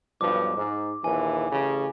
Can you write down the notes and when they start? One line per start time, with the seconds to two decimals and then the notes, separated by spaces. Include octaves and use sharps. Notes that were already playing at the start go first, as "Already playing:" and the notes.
0.21 B1 G2 F3 D6
0.57 G#2
1.04 A#1 D#2 E3 G#5
1.50 A1 C#3